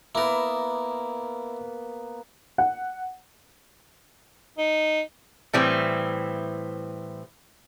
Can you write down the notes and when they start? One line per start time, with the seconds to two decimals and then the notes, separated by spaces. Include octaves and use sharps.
0.15 A#3 B3 E4 A#4
2.58 F#5
4.58 D#4
5.53 A2 E3 G3 C4